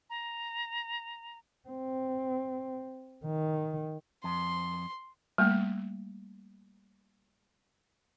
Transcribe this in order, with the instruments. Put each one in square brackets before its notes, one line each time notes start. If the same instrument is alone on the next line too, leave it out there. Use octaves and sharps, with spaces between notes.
[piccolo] A#5
[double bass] C4
D#3
[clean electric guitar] F2 [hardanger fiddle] C6
[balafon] G3 A3 A#3